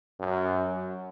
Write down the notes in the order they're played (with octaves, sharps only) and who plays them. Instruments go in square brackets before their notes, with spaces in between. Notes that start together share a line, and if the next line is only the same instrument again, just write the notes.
[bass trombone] F#2